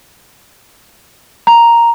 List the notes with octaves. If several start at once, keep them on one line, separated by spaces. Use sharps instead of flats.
A#5